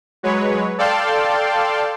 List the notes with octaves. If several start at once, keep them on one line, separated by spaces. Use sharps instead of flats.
F#3 G#3 B4 C#5
A4 D5 F5 G5 A5 C6